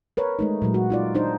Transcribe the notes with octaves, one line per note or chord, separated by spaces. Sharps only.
A#4 B4 C#5
G#3 A3 D#4
A#2 F#3 G#3
F#4
D#4 F4 D5
D4 D#4 C5